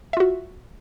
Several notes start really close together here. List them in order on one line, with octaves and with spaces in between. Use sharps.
E5 F4 F#4